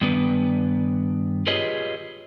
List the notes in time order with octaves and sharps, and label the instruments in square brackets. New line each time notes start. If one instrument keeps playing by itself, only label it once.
[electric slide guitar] G2 D#3 B3 D4 B4
F4 G4 G#4 B4 C#5 D#5